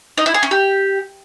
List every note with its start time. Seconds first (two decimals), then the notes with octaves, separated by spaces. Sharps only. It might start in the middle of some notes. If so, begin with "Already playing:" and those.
0.18 D#4
0.26 E4
0.34 G#4
0.43 C#4
0.51 G4